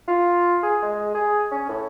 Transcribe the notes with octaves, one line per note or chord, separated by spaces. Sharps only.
F4
G#4
G#3
G#4
C#4
A2